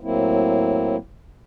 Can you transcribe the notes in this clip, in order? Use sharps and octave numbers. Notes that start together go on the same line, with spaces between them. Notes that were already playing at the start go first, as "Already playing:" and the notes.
A2 F#3 A#3 C4 E4